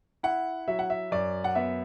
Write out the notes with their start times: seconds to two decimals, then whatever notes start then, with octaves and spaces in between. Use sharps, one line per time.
0.23 E4 F#5
0.68 F#3 E5
0.79 F#5
0.90 E5
1.12 F#2 D5
1.44 F#5
1.55 B3 E5